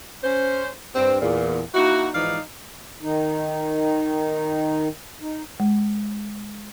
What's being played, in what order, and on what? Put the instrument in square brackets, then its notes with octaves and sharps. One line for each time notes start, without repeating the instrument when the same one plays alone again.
[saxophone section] C#4 C5
G2 C4
E2 A#2
A#3 D#4 E4 F#4
G#2 E3 F3 D#4 D5 F5
[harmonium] D#3 D#4
D#4
[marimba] G#3